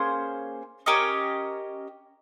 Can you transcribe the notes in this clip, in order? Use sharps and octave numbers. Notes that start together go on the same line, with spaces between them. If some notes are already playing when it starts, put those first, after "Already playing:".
Already playing: A#3 C#4 G#4 C5
C#4 G4 A#4 D#5